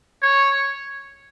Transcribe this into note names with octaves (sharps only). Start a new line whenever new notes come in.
C#5